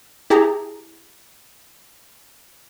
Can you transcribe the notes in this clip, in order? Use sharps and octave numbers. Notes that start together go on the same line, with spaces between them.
E4 G4 G#4 A5 A#5